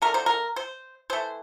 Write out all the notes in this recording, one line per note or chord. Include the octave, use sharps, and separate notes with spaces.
D3 A3 A#4
C5
A#4
C5
E3 A3 C5